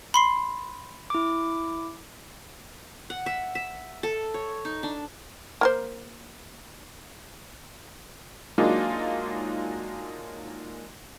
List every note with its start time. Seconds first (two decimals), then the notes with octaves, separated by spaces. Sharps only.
0.14 B5 C6 C7
1.10 E4 D6
3.10 F#5
3.26 E5
3.55 E5
4.03 A4
4.34 C#5
4.65 D#4
4.83 D4
5.61 A#3 A#4 C5
8.58 F#3 G#3 A#3 D4 D#4 F4